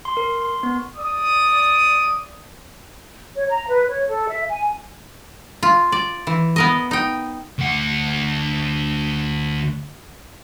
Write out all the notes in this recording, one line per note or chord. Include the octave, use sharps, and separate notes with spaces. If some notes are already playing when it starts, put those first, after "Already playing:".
C6
A#4
C6
B3
D5 D#6
C#5
A#5
B4
C#5
A4
E5
G#5
F4
D5
E3
B3 A#4 D#5
D#4 G5
D2 F#5